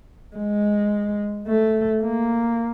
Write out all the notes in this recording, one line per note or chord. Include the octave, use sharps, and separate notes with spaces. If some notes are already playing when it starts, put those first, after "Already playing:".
G#3
A3
A#3